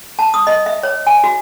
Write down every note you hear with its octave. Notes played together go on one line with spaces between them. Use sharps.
A5
D#6
D#5
E5
C#5
G#5
F#4